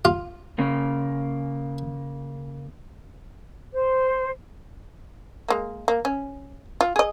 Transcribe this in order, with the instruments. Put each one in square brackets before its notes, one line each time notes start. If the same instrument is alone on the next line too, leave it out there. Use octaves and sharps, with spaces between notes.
[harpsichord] F4
[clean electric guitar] C#3 A#3
[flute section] C5
[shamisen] G#3 A#3
A#3
C#4
F4
G#4 D#5